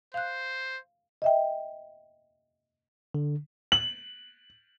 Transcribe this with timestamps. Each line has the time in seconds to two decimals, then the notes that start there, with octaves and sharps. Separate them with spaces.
0.14 C5 F5 F#6
1.22 D#5 E5 G5
3.14 D3
3.72 F#7